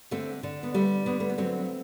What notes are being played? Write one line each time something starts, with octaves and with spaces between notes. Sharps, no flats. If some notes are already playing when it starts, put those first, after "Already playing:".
D3 A3 C4
D3
B3
G3 A3
D3 B3
A3
B3
F#3 A3 C4